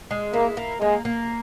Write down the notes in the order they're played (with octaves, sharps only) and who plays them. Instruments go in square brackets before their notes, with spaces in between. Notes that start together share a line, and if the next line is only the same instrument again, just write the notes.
[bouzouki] G#3
[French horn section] A#3 [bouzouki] E4
[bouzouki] A#3
[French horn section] G#3 [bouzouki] A#3
[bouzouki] A#3